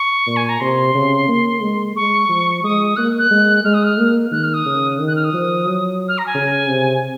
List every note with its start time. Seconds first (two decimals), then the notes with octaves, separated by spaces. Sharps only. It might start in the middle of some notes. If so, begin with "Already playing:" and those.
Already playing: C#6
0.27 A#2
0.36 G#5
0.49 A#5
0.60 C3 C6
0.95 C#3
1.28 A#3
1.62 G#3
1.95 G#3 C#6
2.29 F3
2.64 G#3 D#6
2.97 A#3 F#6
3.19 F#6
3.31 G#3
3.65 G#3 F6
3.74 D#6
3.84 F6
3.98 A#3
4.31 D#3 F#6
4.44 F6
4.54 D#6
4.66 C#3
4.99 D#3
5.08 F#6
5.16 F6
5.24 D#6
5.33 F3
5.66 F#3
6.09 F6
6.18 A#5
6.26 G#5
6.34 C#3
6.68 C3